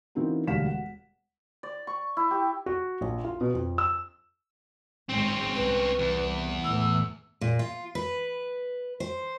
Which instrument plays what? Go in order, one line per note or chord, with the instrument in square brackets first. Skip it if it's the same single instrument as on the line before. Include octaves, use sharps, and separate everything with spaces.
[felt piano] E3 A#3 C4 C#4 D#4 F#4
E1 D2 G3 F5 B6 E7
F#5
[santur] D5
C#6
E4
G4
[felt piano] F#4
A#1
F4
B2
F2
E6
[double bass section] G#1 G#3 [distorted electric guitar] C4 C#4
[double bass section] C2 [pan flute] B4
[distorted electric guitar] E2
[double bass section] A2 E3 A3 [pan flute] E6
[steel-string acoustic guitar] A#2
F4
B4
C5